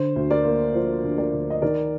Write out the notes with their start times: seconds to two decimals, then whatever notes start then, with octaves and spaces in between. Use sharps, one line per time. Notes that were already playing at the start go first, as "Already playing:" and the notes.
Already playing: D3 C5
0.16 D2
0.30 A#4 D5
0.45 A#3
0.74 F3 C5
1.04 D3
1.18 A#4 D5
1.33 D2
1.50 D#5
1.62 D#3 A#4 D5